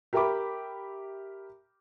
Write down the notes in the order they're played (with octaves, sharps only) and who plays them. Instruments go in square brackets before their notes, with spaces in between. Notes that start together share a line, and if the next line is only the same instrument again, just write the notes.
[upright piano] G4 A#4 E5 G5 B5 D6